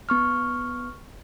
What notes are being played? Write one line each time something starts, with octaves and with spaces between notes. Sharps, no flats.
B3 C#6 F6